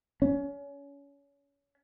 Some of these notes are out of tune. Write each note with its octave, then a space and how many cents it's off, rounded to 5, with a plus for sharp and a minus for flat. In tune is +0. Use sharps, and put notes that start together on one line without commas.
C#4 +30